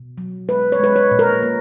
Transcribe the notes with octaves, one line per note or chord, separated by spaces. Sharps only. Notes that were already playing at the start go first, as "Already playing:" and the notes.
Already playing: B2
F#3
G#3 B4
C#5
G#3 B4
C#5
A#2
A#4
A#3